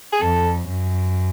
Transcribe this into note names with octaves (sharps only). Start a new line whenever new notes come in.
G#4
F2 A4
F#2